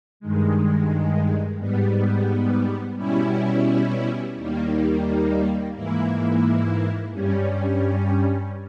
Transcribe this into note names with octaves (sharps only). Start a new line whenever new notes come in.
G2 D#3 G#3
G#2 G3 B3
B2 G3 C#4 E4
D#2 D#3 G3 A#3
G#2 E3 A#3 E4
G2 G3 C#4